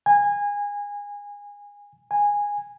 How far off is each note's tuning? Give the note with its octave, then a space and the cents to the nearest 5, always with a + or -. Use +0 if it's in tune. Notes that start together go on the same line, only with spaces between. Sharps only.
G#5 -25
G#5 -15